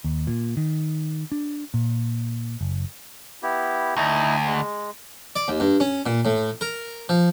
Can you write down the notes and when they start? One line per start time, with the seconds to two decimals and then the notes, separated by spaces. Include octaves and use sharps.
0.04 D#2
0.27 A#2
0.57 D#3
1.32 D4
1.74 A#2
2.61 F#1
3.43 B3 E4 G4
3.97 D2 D#4 E4
4.46 G#3
5.36 D5
5.48 D#2
5.60 G2
5.80 C#4
6.06 A#2
6.25 A2
6.61 A#4
7.09 F3